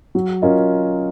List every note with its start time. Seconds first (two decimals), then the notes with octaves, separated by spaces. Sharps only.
0.15 F#3
0.42 C#4 F4 A#4 D#5